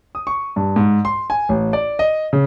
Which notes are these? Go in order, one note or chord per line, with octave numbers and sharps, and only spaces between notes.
D#6
C#6
G2
G#2
C6
G#5
A1
D5
D#5
C#3